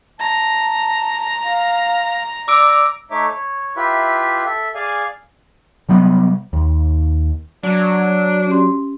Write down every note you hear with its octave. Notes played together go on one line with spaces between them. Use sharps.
A5 A#5
F5
D5 D6 E6 D7
A3 D#4 C#5 E5 D6
C#5
E4 F4 G4 B4 E5
A4 E5
G#4 D5 F5 G#5
C3 F#3 G3 B3
D#2
F#3 D4
C#4 G4 C6